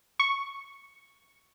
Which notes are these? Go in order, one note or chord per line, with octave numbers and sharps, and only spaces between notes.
C#6